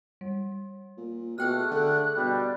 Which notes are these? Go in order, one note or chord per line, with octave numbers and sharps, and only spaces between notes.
G3
A#2
B2 A3 G#4 G5 F6 F#6
D3
B2 G3